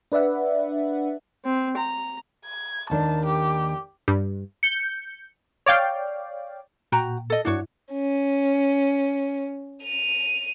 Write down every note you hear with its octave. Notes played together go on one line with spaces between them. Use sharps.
D4 B4 D5 E5 F#5
C4
A#5
G#6
D#2 D#3 D4 A5
G4
G2
G6 C#7
C#5 D5 F5 G5
A#2 F#4 G5 A#5
A4 D#5
G2 D4 E4 F#4 C#5
C#4
D#7 F7